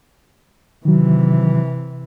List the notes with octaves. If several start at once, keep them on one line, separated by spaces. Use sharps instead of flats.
C3 D#3 E3 F#3